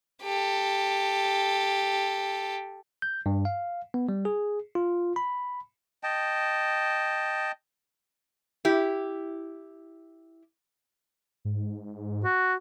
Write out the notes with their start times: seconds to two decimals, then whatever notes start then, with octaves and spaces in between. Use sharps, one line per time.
0.23 G4 A4
3.02 G6
3.26 G2
3.45 F5
3.94 B3
4.09 G3
4.25 G#4
4.75 F4
5.16 B5
6.03 D#5 G5 A5
8.65 E4 G4
11.45 G#2
12.24 F#4